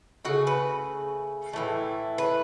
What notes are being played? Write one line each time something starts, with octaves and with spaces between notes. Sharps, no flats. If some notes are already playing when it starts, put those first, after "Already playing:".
C#3 A3 F#4
B4
A2 E3 A3
B4